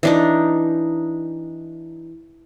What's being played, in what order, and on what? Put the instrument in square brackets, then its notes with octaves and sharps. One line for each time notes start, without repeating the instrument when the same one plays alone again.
[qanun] E3 D4 D#4